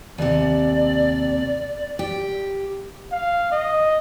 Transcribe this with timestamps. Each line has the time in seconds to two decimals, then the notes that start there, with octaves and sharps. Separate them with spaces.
0.18 D#2 C3 D5
1.99 G4
3.12 F5
3.52 D#5